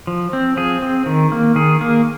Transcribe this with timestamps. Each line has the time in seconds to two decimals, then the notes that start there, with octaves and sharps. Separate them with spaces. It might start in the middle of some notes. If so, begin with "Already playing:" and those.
0.07 F3
0.33 C4
0.57 F3 G#4
0.82 C4
1.06 D#3
1.32 A#3
1.56 D#3 G#4
1.81 A#3